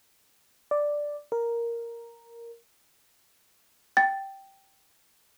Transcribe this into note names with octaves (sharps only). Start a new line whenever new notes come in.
D5
A#4
G5 A6